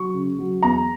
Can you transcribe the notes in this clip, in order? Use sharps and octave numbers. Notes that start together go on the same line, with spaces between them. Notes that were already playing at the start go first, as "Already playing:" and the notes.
Already playing: F#3 C#6
C#3
F#3
E2 A#5